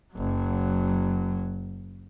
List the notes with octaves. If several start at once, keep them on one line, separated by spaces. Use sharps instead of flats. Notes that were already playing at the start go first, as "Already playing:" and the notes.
F#1 F#3